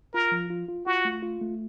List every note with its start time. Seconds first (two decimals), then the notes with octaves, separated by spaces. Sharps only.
0.13 F4 A#4
0.32 F3
0.50 F4
0.68 F4
0.86 F4 F#4
1.05 A3
1.23 F4
1.41 A3